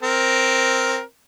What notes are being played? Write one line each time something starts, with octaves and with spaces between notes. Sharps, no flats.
C4 A#4